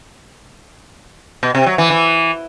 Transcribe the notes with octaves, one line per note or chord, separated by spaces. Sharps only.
B2
C3
F#3
E3
E3